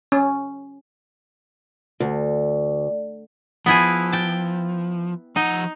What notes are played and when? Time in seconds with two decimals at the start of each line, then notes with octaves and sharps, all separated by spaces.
0.12 C#4
2.00 D2
3.66 F3 B3 E4 G#4
4.13 G5 A5
5.36 F3 D#4 F#5